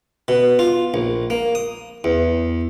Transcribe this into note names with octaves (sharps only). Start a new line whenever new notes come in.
B2
F4
A#1
A#3
D#6
E2